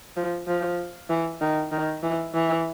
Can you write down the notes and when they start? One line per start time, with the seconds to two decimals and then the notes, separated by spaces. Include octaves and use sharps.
0.17 F3
0.47 F3
1.10 E3
1.41 D#3
1.72 D#3
2.03 E3
2.34 E3